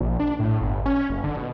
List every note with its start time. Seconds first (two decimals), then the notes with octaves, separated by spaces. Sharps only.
0.01 A#1
0.20 D4
0.39 A2
0.61 G1
0.86 C#4
1.10 F#1
1.24 D3
1.37 B2